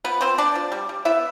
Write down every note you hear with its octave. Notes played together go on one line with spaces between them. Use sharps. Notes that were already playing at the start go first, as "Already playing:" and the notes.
F3 B3 B4
F3 C4 C5
B3 D4 D5
F3
G3
G3
B3 E4 E5